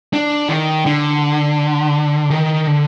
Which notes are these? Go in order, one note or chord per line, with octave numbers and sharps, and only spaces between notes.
D4
D#3
D3
D#3
D3